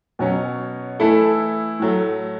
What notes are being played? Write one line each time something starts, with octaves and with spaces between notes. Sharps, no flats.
B2 F#3 C#4
E3 A3 E4 A4
A2 F#3 A3